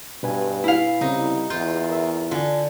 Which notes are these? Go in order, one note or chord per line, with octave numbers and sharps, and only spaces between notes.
G2 B2 B4 G#5
E4 F5
C2 C#3 C4 D#4
E2 F4 G6
A#4 E5
D3 F4 G#5